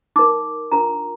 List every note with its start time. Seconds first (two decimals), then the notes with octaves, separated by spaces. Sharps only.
0.16 D#4 A#4 D6
0.72 D4 F4 A#4 A#5